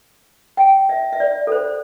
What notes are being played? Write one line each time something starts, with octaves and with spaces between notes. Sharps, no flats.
G5
E5
E5
D5
A4
C5